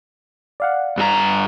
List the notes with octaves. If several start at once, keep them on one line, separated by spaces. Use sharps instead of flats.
D5 F5 F#5
G2 F#4 A#5